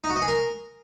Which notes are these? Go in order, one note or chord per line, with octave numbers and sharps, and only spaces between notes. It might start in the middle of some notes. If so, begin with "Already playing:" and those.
D#4
F#4
D#5
G#4
A#4